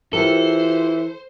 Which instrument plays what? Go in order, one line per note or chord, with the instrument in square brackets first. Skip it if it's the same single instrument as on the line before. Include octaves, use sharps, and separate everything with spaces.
[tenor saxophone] E3 [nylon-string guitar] F4 G4 A#4 [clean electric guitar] A4 [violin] C5